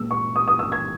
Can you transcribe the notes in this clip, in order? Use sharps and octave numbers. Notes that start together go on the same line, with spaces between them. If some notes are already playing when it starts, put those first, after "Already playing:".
Already playing: A#2 G#3 E6
C#6
D#6
D#6
E6
G#6